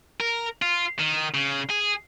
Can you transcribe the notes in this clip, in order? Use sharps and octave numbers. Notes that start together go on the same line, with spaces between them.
A#4
F4
D#3
C#3
G#4